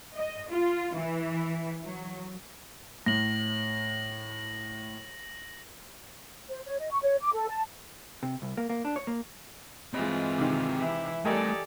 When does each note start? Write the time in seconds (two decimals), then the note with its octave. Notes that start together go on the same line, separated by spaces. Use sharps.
0.15 D#5
0.49 F4
0.96 E3
1.83 F#3
3.06 A2 A#6 F#7
6.49 C5
6.66 C#5
6.79 D#5
6.91 C#6
7.03 C#5
7.21 D6
7.34 A4
7.50 A5
8.23 C3
8.42 C2
8.57 A#3
8.69 A#3
8.85 D4
8.96 C#5
9.07 A#3
9.94 E3 G#3 C4 F4 D#5
10.38 C3 D#3
10.77 E3 E4
11.25 G3 A3 G4 A4 A#4 D5 D#5 G#5